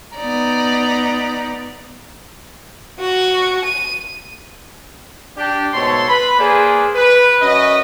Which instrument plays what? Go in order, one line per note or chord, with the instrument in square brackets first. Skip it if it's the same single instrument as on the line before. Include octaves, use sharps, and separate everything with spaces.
[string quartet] B3 D#4 D5 A#5
[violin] F#4
D#7
[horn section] D4 G4
G#2 B2 A3 C#5 A5 C6
B4 B5
A#3 G#4 B4 C5 D5
B4
F#2 C#4 B4 D#5